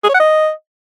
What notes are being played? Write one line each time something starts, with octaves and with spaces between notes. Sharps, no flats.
G#4
C#5
F#5
D#5